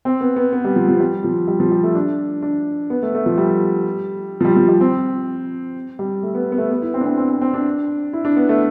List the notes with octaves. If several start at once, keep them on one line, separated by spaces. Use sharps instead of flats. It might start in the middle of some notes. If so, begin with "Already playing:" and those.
C4
B3
B3
B3
G3
F3
F3
G3
F3
G3
F3
G3
A3
D4
D4
B3
A3
A3
F3
G3
F3
G3
F3
G3
C4
G3
A3
B3
B3
A3
B3
E4
C4
D4
C4
C4
C4
C4
D4
E4
D4
B3
A3